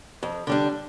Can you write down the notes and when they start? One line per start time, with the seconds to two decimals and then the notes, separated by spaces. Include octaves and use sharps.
0.23 F2
0.47 D3 G3 D4